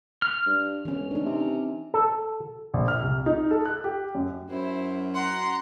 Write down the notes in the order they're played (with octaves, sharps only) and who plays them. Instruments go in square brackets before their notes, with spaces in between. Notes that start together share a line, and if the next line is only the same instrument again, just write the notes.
[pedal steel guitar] F6
[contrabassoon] G2
[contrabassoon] E1 [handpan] E3 C#4
[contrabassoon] D2 [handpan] D4 D#4
[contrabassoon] C3
[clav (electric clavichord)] A4
[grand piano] A#1
F6
C2
D#4
A4
F#6
G4
F#2
[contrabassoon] F#2 [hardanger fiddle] E4 C5
[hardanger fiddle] F#5 A#5 [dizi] C6